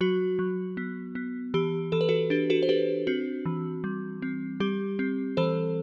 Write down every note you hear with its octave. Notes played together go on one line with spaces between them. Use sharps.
F#3 F#4
F#3
B3
B3
E3 G4
E3 A4
B4
F#4 A4
D4 G4
F#4 A4
C5
D4 G4 B4
C4 F#4
E3
G3
C4
G3 G4
C4
E3 A4 C5